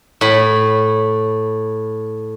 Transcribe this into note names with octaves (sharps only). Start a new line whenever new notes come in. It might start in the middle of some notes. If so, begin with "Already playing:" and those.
A2 B5